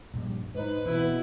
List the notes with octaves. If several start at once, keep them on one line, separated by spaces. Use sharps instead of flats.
A#1 G2 G3
G#2 D#4 B4 C5
B2 E3 C4 E4